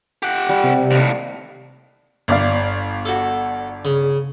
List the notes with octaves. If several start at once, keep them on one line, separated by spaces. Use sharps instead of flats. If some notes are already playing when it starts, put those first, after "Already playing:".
G4 F#5
G3
C3
D#2 A2
G1 D5 F5
F#4 A4
C#3